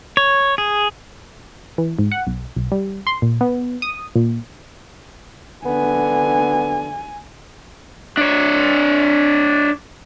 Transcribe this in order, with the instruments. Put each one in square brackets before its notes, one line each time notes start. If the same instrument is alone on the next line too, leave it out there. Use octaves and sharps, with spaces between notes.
[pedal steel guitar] C#5
G#4
[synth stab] E3
G#2
F#5
B1
B1
G3
C6
A#2
B3
D#6
A#2
[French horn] D3 [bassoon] B3 [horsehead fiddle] G#5
[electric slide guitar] D4 C#5